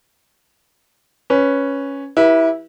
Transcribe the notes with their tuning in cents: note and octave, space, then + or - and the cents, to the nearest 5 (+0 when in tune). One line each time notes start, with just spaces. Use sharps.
C#4 +0 B4 +0
E4 -10 G4 +0 B4 -35